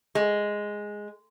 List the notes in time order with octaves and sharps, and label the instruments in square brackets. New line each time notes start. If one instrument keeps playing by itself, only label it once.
[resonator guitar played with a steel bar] G#3